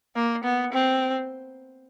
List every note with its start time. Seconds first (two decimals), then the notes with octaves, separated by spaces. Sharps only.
0.15 A#3
0.44 B3
0.73 C4